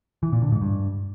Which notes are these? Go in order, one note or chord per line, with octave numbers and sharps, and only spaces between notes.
E3
A#2
D3
G#2
G2